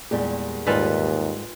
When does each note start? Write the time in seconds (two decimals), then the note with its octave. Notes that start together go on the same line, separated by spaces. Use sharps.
0.11 E2 A#2 G3 G#3 G4
0.66 D#2 G#2 G3 F4 A4 B4 G#5